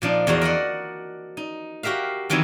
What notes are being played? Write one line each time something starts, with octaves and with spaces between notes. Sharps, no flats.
A#2 F3 D4 D#4
E2 F3 F#4 A#5
A#4 D5 D#5 F#5
D#4
F#4 G4 A#4 E5 F5
D#3 E3 F#3 C4 D#4 E4